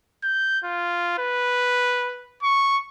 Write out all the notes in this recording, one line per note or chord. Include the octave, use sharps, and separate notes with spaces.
G6
F4
B4
C#6